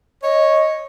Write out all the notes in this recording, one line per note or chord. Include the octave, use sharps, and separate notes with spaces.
C#5 D#5